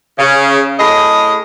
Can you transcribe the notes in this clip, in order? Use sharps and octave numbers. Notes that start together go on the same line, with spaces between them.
C#3
A2 G#4 D#5